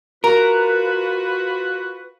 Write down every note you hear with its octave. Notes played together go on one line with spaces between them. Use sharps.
F4 F#4 A#4 B4